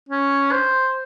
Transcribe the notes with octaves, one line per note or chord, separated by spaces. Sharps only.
C#4
C5